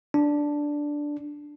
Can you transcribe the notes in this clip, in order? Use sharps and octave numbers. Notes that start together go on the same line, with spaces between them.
D4